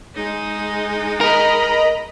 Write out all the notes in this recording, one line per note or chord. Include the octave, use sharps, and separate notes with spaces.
G#3 D#4
A#4 D#5 A#5 B5